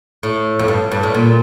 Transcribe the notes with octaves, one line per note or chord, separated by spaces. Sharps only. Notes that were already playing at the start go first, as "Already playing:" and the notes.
A2
F2
G2
G2
A2
A#2